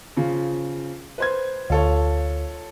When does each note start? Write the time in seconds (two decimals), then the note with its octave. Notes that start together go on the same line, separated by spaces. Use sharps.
0.16 C#3 F3
1.18 B4 C5 G#6
1.70 D2 F4 A4 C#5